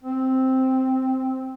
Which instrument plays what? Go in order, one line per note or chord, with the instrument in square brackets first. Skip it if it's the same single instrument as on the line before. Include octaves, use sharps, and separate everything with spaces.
[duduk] C4